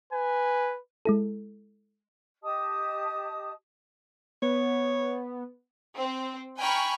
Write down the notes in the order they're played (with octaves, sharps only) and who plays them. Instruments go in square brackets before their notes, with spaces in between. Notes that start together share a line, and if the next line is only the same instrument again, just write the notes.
[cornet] B4 [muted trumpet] G#5
[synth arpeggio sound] G#3 E4 A4
[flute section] G4 D#5 A5 D#6
[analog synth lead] B3 [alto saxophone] C#5
[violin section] C4
G5 G#5 A#5 B5 C#6 F6